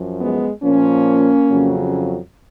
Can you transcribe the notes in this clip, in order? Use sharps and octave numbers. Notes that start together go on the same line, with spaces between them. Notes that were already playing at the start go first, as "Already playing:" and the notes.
Already playing: F#2 F3
G#3 B3
A#2 F3 A#3 C#4
F2 C#3 F#3